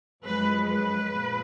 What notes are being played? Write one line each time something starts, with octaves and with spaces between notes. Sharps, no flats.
F#2 F3 G#3 B4
B4
A#2